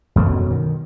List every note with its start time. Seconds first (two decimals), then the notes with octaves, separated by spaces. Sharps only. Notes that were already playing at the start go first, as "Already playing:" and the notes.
0.16 F#2 B2 D3 F#3
0.51 D#3